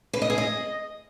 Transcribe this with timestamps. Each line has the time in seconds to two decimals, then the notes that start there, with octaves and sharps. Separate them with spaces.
0.13 B4
0.22 D#5
0.30 G#4
0.38 D#5